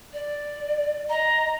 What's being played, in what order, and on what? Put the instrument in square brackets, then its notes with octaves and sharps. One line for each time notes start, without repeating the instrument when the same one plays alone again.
[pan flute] D5
[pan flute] D#5 [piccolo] A#5